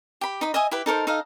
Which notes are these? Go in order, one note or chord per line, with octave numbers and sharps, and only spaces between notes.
G4 B5
D#4 D#5 B5
D#5 E5 G#5 D#6
E4 G4 B4
D#4 A4 A#4 C5
D#4 A4 D#5 F5